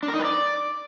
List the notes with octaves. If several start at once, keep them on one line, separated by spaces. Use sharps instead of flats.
D4
A#4
D#4
B4
D5